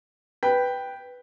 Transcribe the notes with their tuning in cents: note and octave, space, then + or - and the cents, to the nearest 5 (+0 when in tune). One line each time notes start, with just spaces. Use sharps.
B4 +0 G5 +0